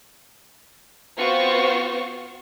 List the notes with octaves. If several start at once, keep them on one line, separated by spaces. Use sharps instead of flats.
B3 C4 F4 F#4 C5 C#6